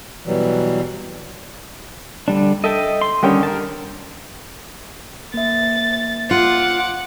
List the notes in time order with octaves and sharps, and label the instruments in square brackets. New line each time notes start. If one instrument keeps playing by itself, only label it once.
[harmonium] B2 E3 F#3 G3
[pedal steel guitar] D3 G3 D4
[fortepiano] A4 [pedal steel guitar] D#5 E5 G5
[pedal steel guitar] C6
[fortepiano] D3 D#3 G5 [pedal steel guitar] G3 C#4 G4
[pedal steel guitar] A#4 A5
[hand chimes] A#3 E5 [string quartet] A6
[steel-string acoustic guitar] F4 [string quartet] F#5 D6